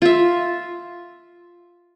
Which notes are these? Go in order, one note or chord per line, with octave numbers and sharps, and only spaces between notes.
F4 E5